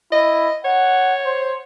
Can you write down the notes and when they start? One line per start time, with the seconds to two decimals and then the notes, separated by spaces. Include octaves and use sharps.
0.12 E4 D#5
0.65 C#5 F#5
1.25 C5